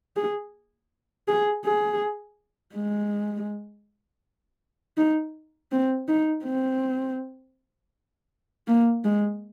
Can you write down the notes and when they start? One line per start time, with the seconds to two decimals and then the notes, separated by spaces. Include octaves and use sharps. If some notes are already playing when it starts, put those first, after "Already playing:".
0.16 G#4
1.28 G#4
1.65 G#4
2.75 G#3
4.97 D#4
5.72 C4
6.08 D#4
6.45 C4
8.68 A#3
9.05 G#3